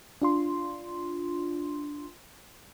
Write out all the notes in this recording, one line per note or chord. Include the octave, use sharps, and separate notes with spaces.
D4 F4 C6